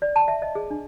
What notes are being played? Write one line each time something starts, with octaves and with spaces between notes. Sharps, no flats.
D5
A5
E5
D#5
G#4
D4